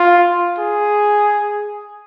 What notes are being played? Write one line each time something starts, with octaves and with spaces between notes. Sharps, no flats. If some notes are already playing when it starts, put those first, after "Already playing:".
Already playing: F4
G#4